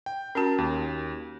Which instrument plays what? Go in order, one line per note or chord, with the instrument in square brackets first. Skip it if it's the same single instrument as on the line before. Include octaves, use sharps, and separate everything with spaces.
[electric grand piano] G5
[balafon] C#4 F#4 [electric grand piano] A#4 A5
[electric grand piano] D#2